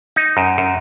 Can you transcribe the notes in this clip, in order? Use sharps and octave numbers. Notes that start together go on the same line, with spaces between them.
D#4
F#2
F#2